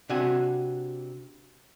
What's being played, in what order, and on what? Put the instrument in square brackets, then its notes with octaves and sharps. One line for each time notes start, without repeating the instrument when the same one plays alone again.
[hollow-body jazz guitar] C3 D4 F#4 G#5